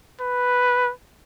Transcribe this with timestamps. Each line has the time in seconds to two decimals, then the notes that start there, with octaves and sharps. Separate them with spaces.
0.21 B4